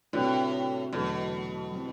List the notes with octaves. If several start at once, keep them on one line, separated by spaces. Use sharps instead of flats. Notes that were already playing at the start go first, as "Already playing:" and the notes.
A2 C3 G3 D4 F#4 B4
E2 B2 D3 F#3 A3
G3 C4 E4